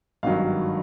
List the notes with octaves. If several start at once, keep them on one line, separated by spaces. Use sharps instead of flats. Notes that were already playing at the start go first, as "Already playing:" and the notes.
G#1 G2 D#3 F#3 F5